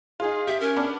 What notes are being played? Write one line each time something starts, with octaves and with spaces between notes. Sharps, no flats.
D#4 F4 G#4
G4 E5
C#4 A#4
B3 D4 D5